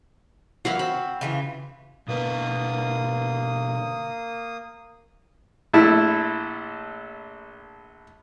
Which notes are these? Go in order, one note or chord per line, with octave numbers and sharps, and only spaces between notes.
E3 F#3 A#3 F#4 F5 B5
C4 B5
C#3 E3 F4
B2 D3 A#3 B4 D#6
A#1 A3 E4